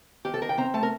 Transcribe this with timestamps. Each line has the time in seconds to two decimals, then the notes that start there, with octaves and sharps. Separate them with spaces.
0.25 D#3 G4
0.34 A4
0.42 D#3 A#4
0.49 G5
0.58 C4 A#5
0.74 A3 A5
0.83 A#4